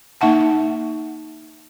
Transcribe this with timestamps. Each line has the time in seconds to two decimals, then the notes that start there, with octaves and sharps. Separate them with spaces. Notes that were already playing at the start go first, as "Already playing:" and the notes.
0.21 A#3 D#4 E5 F#5 A5